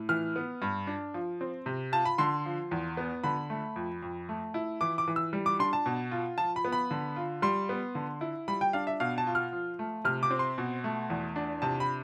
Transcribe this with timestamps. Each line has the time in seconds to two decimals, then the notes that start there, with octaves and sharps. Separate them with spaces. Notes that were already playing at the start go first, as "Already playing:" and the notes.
Already playing: A2
0.09 E3 F6
0.36 B3
0.62 G2
0.87 D4
1.14 F3
1.41 C4
1.66 C3
1.92 F4 A5
2.05 B5
2.18 D3 C6
2.46 F3
2.71 E2
2.97 B3
3.24 D3 B5
3.50 A3
3.76 F2
4.03 F2
4.29 A3
4.54 E4
4.81 E3 D6
4.98 D6
5.08 E3
5.16 E6
5.33 G3
5.46 D6
5.59 D4 C6
5.73 A5
5.86 B2
6.12 F4
6.38 F3 A5
6.56 B5
6.65 B3
6.72 B5
6.91 D3
7.16 F4
7.42 G3 C6
7.69 B3
7.95 D3
8.21 E4
8.48 G3 B5
8.61 G5
8.73 D4 F5
8.87 E5
9.00 B2 F5
9.18 A5
9.27 F4
9.35 F6
9.52 F3
9.79 A3
10.05 C3 F6
10.23 D6
10.31 C4
10.39 C6
10.58 B2
10.84 A3
11.10 E2
11.36 D4
11.62 C3 A5
11.80 B5